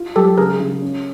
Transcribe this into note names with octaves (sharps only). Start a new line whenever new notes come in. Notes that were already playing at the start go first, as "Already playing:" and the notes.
Already playing: F4
F#3 G4 A4
C#3 G#4 A#4
C#3
C#4